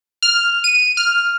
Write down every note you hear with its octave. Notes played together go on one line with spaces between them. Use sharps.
F6
D#7
F6